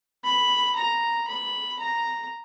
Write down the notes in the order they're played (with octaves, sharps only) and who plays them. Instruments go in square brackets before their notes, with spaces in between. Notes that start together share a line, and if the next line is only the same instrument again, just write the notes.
[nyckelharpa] B5
A#5
B5
A#5